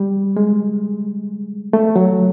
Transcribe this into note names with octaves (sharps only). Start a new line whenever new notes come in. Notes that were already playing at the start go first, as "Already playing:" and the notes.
Already playing: G3
G#3
A3
F#3